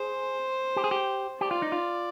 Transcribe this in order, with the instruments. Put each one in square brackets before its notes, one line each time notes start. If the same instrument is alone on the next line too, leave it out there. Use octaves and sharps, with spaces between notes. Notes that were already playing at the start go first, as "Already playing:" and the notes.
Already playing: [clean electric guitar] G#4 [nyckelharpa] C5
[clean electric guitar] G4
G#4
G4
[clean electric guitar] G4 [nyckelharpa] D5
[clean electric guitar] F4
D#4
F4